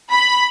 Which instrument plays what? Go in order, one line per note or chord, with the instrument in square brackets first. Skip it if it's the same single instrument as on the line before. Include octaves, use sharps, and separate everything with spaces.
[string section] B5